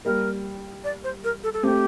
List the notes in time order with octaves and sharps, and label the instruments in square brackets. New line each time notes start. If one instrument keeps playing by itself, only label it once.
[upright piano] G3 A#3 [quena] A#4
[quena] D5
C5
A#4
A4
A4
[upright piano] A3 C4 [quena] G4